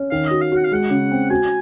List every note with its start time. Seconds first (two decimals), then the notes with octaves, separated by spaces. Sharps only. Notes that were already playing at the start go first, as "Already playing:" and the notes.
Already playing: C#4
0.11 D#3 F5
0.27 F#4 D#5
0.41 F5
0.52 F#4 F#5
0.64 F5
0.72 G#3 F#5
0.90 C#3
1.11 C4
1.30 F#4 G#5